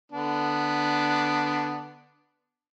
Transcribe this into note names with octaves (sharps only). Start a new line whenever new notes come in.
D3 B3 D4